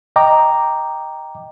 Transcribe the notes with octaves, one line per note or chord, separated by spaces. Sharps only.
D#5 G5 A#5 D6